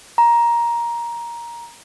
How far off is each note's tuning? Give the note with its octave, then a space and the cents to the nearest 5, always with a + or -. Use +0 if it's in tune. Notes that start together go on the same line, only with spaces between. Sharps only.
A#5 +15